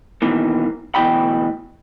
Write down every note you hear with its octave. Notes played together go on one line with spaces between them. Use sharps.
B2 D#3 E3 A#3
D2 B2 E3 G5 B5